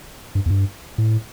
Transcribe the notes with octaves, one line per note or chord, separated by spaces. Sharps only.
G2
E2
G2
A2